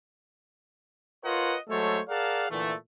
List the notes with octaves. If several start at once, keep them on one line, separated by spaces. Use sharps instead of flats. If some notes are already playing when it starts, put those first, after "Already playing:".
F4 A#4 B4 C#5 D#5 F#5
F#3 G#3 A3 A4 C5 C#5
G#4 A#4 D5 F5 F#5 A5
A#2 D3 E3 A3